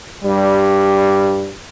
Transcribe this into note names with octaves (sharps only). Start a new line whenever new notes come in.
G2 G3